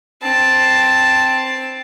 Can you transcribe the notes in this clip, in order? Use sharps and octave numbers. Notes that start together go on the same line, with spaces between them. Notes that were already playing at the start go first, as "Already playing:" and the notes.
C4 A5